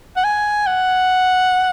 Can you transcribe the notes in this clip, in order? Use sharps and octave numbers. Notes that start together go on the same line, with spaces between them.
F#5
G#5
F#5